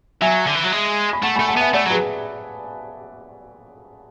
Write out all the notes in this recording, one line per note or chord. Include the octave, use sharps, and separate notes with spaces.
F#3 E5 G#5
D3
E3
F#3
G#3
B5
A3 F#5 A5
A3 G#5 B5
F#5 A5
B3 E5 G#5
A3 D5 F#5
F#3
G#4 B4